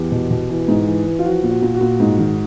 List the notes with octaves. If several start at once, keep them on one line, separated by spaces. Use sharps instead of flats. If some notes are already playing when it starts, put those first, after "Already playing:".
Already playing: E2 G4
B2
B2
E3
G#2
E3
E3
F4
F3 F#4
A#2
F#4
A#2
F#4
A#2
G#2
D#3